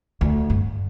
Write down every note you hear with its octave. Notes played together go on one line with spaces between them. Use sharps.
D2
G2